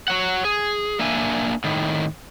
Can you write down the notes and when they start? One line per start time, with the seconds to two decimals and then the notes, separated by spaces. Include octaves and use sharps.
0.08 F#4 C#5 F#5
0.45 G#4
0.99 A#3 D4 E5 G#5
1.64 A2 D#3